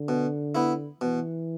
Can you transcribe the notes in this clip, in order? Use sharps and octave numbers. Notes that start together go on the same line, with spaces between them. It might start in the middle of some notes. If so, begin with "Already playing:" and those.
Already playing: D3
B2
B3 E4
B2 E3